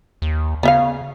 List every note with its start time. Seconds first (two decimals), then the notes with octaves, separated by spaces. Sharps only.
0.22 D#2
0.63 C#3 B3 E5 F5